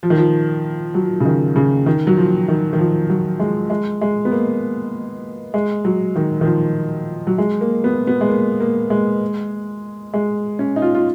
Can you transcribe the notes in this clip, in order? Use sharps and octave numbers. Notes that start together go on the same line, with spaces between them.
F3
D#3
F3
F#3
C#3
D#3
C#3
D#3
F#3
F3
D#3
D#3
F3
F#3
G#3
G#3
G#3
B3
A#3
G#3
F#3
D#3
D#3
F3
F#3
G#3
A#3
B3
B3
G#3
A#3
A#3
G#3
G#3
C#4
D#4
F4
F4